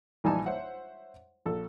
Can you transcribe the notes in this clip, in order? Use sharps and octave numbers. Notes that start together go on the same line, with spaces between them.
A#1 E3 G3 D#4 G#5 A5
C5 C#5 E5 F#5
A#1 A4